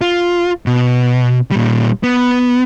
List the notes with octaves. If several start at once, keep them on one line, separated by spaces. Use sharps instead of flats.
F4
B2
A#2 G3
B3